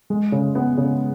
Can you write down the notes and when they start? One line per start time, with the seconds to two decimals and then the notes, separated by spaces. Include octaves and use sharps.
0.10 G#3
0.32 C#3
0.55 B3
0.78 C#3